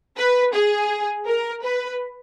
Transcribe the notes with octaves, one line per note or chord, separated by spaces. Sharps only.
B4
G#4
A#4
B4